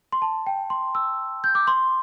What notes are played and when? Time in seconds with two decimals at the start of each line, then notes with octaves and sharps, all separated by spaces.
0.12 C6
0.22 A5
0.46 G5
0.70 C6
0.95 E6
1.44 G6
1.55 D6
1.67 C6